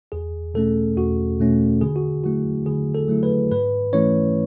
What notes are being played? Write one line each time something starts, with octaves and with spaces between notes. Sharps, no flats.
E2 G#4
B2 A3 C#4 A4
E2 F#4
B2 A3 C#4
D3 G#4
F#4
F#3 A3 E4 F#4
D3 G#4
A4
F#3 A3 E4
B4
G#2 B4
E3 A3 C#4 E4 C#5